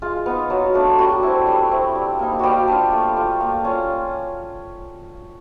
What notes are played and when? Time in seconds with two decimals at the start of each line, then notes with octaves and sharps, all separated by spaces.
0.02 G#3 F4
0.26 B3 D#4
0.50 F#3
0.74 A3 D4
0.98 G3 F#4
1.23 C4 E4
1.47 G3
1.71 C4 E4
1.95 G3
2.19 A#3 D#4
2.39 G3 A#3 F#4 G4
2.68 D4 F4
2.92 A3
3.16 D4 F4
3.40 A#3
3.64 C#4 F4